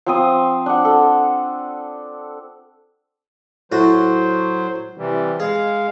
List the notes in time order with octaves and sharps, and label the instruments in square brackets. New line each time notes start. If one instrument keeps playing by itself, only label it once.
[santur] F3 C4 D#6
D4 F#5
A4
[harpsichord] A2 F#4 [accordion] F#3 C5
[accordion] C3 E3 G3
[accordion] G#3 F5 [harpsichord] G#4